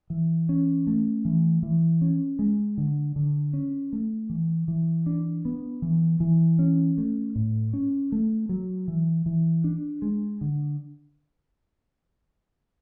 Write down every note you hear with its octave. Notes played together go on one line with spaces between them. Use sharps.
E3
C#4
A3
E3
E3
C#4
G#3
D3
D3
C#4
A3
E3
E3
D4
B3
E3
E3
C#4
A3
A2
C#4
A3
F#3
E3
E3
D4
G#3
D3